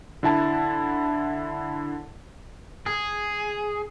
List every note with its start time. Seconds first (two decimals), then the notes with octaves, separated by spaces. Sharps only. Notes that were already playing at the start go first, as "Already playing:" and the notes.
0.23 D3 E4 A5
2.86 G#4